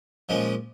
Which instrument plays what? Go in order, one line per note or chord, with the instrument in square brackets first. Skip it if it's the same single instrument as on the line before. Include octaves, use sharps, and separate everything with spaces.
[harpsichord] A#2 F3 G#3 C#4